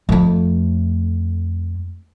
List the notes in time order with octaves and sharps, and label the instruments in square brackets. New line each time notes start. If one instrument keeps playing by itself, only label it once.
[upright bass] F2 A3